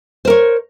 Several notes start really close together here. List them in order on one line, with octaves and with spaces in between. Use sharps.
C5 A#4 C#5